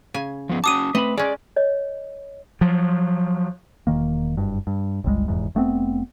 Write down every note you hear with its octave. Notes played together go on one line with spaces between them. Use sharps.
C#3 G#5
F3 B3
C#4 F#4 A5 D6 D#6 D#7
A3 C4 B4 D#5 B5
G#3 C#4 G#4 D5
C#5 D#5
F3 F#3
E1 D#3 A#3
F#1 G2
G2
G1 C#2 G3 G#3
F1 E2 G#2
F1 A3 B3 C4